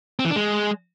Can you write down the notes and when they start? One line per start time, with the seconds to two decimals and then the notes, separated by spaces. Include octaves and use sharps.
0.19 C4
0.25 E3
0.30 D4
0.36 G#3